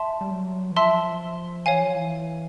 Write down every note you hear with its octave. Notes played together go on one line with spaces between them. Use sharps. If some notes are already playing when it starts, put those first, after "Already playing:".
Already playing: E5 A5 C6
G3
F#3
E3
F3 E5 A5 C6 E6
E3 C#5 F5 G#5
F3
E3